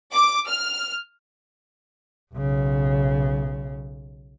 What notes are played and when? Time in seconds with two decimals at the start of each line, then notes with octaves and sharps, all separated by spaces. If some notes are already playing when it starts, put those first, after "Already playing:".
0.12 D6
0.47 F6
2.34 B1 C#3